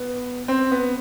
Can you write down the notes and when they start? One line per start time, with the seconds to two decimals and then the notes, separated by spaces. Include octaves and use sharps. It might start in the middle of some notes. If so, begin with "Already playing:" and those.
Already playing: B3
0.48 C4
0.71 B3